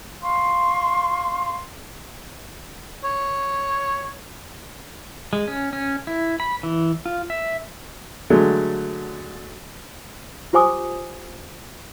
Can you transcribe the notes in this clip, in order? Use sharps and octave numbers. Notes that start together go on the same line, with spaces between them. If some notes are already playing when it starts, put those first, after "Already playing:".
F5 C6 C#6
C#5
G#3
C#4
C#4
E4
B5
E3
F4
E5
D3 F#3 G#3 A3
F4 G4 C5 G#5 D6 D#6